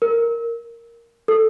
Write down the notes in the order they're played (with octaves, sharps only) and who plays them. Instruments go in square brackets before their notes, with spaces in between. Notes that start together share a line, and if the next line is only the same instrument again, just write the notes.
[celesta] A#4
A4